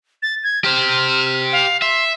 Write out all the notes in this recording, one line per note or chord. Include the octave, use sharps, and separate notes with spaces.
A6
G#6
G4 C5 F6
F5
E5 C6